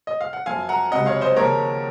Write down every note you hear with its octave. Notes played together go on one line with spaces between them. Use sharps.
D#5
F5
F#5
F#2 F3 F5 G#5
F#5 A#5
C#2 C3 F#3 D#5 F#5
C#5 F5
C5 D#5
D#2 C#3 F3 A#4 C#5